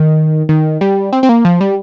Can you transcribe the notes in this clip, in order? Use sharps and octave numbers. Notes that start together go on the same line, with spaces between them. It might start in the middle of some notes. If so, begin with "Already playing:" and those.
Already playing: D#3
D#3
G3
C4
C4
A#3
F3
G3